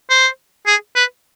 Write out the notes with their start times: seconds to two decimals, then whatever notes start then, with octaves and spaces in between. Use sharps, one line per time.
0.10 C5
0.67 G#4
0.96 B4